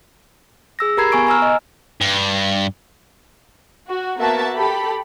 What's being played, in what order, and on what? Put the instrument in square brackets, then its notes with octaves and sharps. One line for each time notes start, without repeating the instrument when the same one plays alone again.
[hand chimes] G#4 E6 A#6
G4 A#4 A#5 B5 G#6 C7
B3 G#5 C#6 D7
G#5 A#5 E6 F6
D#5
[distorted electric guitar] G2
[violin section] F#4
A#3 B3 F#4 A#4 E5 A5
G4 A4 B5